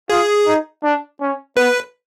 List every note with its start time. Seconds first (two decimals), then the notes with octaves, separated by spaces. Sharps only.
0.10 F4 G#4
0.46 D#4
0.83 D4
1.21 C#4
1.57 B3 B4